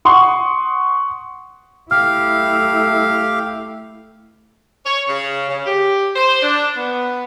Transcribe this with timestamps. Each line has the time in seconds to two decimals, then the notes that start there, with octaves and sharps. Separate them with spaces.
0.05 F#5 C6 C#6 D#6
1.91 A3 E4 G4 F5 F6
4.86 C#5
5.07 C#3
5.49 C#3
5.65 G4
6.15 C5
6.42 D4
6.76 B3